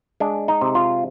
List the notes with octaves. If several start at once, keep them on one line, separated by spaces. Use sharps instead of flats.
G#3 D4
D#4
C3
F4